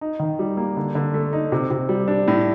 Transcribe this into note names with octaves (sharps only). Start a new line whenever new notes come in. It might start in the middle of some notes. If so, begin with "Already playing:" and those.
D#4
D#3
G3
A#3
D3
D3
A3
D#4
C3
C3
G3
D4
A2